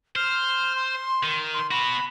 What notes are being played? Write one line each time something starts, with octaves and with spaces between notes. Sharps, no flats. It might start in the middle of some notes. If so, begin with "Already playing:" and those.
C5 F6
C6
D#3
C6
B3 F#4 B5